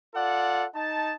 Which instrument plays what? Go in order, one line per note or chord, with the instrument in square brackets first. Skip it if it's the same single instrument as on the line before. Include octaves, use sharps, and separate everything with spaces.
[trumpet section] F4 A4 D5 F#5
D#4 A5